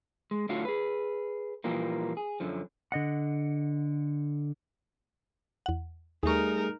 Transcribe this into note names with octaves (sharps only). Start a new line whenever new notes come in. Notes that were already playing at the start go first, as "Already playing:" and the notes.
G#3
A2 D3 F#3 A3 F4 F#4
G#4 B4
A#2 E3 F3 G3 A#3
G#4
F#2 D3 F3
D3 D#5 F#5
E2 F#5
D#2 G3 A3 D#4 G#4 A#4 C#6